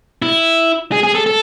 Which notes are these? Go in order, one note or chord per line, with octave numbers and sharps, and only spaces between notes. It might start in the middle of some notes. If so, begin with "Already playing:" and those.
E4
G#4
G#4
A4
A4